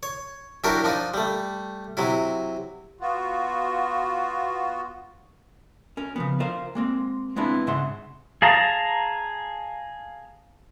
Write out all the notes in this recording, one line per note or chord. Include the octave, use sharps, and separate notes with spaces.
C#5
F#3 D4 E4 F#4 G4 A#4
F3 D4 D#4
G3 A3
C3 F#3 E4
B3 F4 F#4
C#4 A#4
C#3 F3 B3
F4 A#4 C5 F5
G#3 A#3 C4
G#3 B3 C4 D4 E4 F4
G#2 C#3 G#3 E5 F#5 C6
G#4 F5 A5 A#5